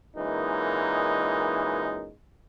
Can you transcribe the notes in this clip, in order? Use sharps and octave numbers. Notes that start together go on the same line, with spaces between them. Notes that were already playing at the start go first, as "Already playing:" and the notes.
F#2 A#2 E3 G#3 D#4